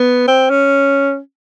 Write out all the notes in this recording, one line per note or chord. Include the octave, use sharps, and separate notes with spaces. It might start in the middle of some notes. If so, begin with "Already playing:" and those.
Already playing: B3
C4
C#4